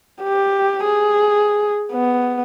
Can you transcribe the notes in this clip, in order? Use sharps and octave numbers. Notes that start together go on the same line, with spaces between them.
G4
G#4
B3